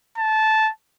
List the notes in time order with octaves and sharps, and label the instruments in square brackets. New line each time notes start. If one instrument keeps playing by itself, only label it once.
[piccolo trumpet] A5